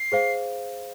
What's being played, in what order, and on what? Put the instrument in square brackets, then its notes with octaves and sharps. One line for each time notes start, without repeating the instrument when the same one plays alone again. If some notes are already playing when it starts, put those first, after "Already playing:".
Already playing: [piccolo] C7
[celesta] G#4 C5 F5